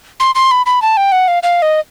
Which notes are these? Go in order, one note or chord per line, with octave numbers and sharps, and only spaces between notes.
C6
C6
B5
B5
A5
G5
F#5
F5
F5
D#5